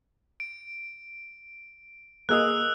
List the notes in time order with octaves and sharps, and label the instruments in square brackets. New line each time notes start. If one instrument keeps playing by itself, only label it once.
[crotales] D7
[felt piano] A#3 G#4 D#5 [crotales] D#6 E6 F#6